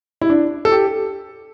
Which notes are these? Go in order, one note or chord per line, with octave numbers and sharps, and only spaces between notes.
E4
D4
A4
G4